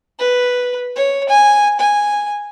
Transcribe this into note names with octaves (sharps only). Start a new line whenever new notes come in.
B4
C#5
G#5
G#5